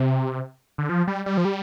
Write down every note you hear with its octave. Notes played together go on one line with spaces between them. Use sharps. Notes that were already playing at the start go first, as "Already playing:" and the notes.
Already playing: C3
D3
F3
G3
G3
F3
G3